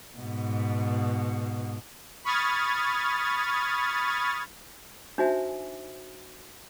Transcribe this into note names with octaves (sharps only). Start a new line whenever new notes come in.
G#2 B2
B5 C#6 D#6 F6 G#6 A6
D4 D#4 F#4 C5 E5 G#5